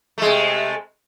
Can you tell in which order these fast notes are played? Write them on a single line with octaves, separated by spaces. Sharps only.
A3 G#3 C3